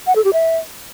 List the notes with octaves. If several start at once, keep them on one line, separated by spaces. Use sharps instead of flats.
F#5
A4
G4
E5